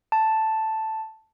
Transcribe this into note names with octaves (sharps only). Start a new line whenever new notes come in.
A5